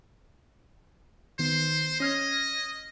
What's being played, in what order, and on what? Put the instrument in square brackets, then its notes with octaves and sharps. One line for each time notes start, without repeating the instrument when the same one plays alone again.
[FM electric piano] D#3 B3 [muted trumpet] C5
[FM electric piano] C#4 F6 G#6 [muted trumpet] D#5